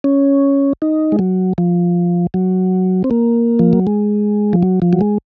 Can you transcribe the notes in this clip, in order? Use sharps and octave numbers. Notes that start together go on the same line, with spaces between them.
C#4
D#4
G#3
F#3
F3
F#3
C4
A#3
F3
F#3
G#3
F3
F#3
F3
F#3
G#3